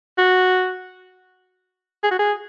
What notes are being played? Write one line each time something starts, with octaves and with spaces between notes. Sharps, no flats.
F#4
G#4
F#4
G#4